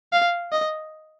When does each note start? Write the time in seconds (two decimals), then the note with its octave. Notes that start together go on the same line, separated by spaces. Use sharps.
0.13 F5
0.52 D#5